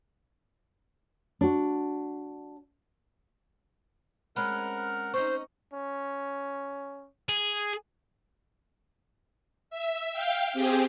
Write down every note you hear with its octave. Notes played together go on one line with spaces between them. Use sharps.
D4 F#4
G#3 C4 C#4 A#4 F#5 B5 F6 F#6
C4 C#4 D#4 C5 C#6
C#4
G#4
E5
F5 G5
C4 G4 G#4